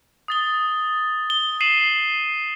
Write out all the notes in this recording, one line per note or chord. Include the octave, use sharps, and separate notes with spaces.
D#6 A6 G7
G7
C7 D#7 E7 F#7